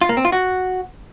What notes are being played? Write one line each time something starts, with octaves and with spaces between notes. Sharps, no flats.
F4
A#3
C4
F4
F#4